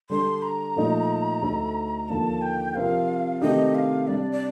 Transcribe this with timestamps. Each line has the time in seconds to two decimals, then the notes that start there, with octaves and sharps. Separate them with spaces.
0.10 D3 G3 D4 A4 C6
0.42 A#5
0.76 A#2 F3 A3 D#4 A4
1.42 D2 D3 A3 D#4 A4
2.09 D#2 D3 F3 A#3 D4 A5
2.42 G5
2.75 C3 F3 C4 G4 A#4 F5
3.41 C3 D#3 A3 D4 G4 D#5
3.75 F5
4.07 C3 G3 D4 D5
4.32 D5